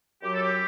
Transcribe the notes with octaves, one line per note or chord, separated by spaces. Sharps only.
F#2 F#3 G4
A4
G4